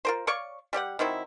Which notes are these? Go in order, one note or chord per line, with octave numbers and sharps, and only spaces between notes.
F4 A#4 C5
C#5 D5 F5 C#6
G3 G4 C#5 F#5
D#3 F#3 C4 E4